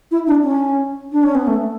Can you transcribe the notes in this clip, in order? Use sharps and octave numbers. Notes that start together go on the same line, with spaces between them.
E4
D4
C#4
D4
C#4
B3
A3